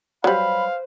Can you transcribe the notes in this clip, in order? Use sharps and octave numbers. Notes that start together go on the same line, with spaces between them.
F#3 G3 B4 C5 F5 B5